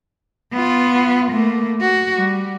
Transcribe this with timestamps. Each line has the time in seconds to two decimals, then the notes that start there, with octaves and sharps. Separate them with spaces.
0.52 B3 F4
1.31 A3 A#3
1.81 F#4
2.14 G3